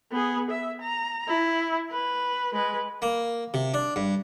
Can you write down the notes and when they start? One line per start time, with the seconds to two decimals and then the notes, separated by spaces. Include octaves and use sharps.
0.12 B3 G#4
0.50 E5
0.81 A#5
1.28 E4
1.91 B4
2.54 G#3 B4
3.02 A#3
3.54 C3
3.74 D4
3.96 G2